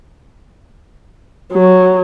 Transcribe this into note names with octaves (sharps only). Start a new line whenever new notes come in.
F#3